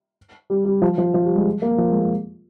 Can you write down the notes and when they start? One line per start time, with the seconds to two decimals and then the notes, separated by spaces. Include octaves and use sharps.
0.50 G3
0.65 G3
0.82 F3
0.98 F3
1.14 F3
1.25 G3
1.36 G#3
1.62 A#3
1.78 F3
1.90 G#3
2.00 A#3